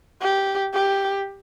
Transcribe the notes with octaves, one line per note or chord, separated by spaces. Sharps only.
G4
G4